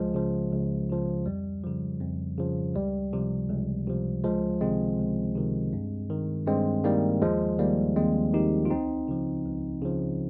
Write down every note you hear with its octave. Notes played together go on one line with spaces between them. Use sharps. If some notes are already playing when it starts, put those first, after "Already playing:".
Already playing: C#2 F3 G#3
C#3 F3
C#2
C#3 F3
F2 G3
C#3 F3
F2
C#3 F3
C#2 G3
C3 F3
C#2
C3 F3
C#2 F3 G#3
C3 D#3 G#3 C4
C#2
C3 D#3
G2
D#3
G2 G#3 C4
D#3 G3 A#3
D#2 F3 G#3
D#3 G3 A#3
D#2 G#3 C4
D#3 D#4 G4
F4
C#2 C4 D#4
C#3 F3
C#2
C#3 F3